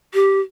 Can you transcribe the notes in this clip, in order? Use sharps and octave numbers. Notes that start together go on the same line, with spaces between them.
G4